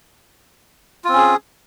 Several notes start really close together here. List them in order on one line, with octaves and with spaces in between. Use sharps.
F4 C4 C#4 G#4